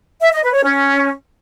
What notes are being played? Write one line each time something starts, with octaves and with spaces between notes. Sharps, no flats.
E5
D#5
B4
C#5
C#4